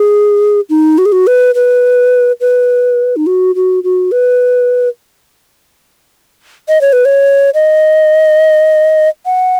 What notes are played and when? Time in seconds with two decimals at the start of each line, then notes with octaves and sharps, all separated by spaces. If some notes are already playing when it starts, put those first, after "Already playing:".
Already playing: G#4
0.70 D#4
0.98 F#4
1.06 G#4
1.12 F#4
1.27 B4
1.55 B4
2.41 B4
3.16 D#4
3.27 F#4
3.55 F#4
3.84 F#4
4.12 B4
6.69 D#5
6.81 C#5
6.93 B4
7.05 C#5
7.54 D#5
9.26 F#5